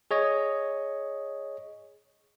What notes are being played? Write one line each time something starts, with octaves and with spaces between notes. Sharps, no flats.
G#4 C#5 D#5